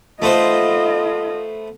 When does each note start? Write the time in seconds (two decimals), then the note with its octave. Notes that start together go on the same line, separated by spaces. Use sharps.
0.22 A3 B3 F4 C5 D#5